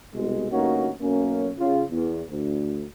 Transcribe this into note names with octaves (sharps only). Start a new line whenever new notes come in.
C2 B2 G#3
D2 G2 A#3 C#4 D#4 F#4
B1 F#2 A#3 C#4
C#3 F4
E2
D2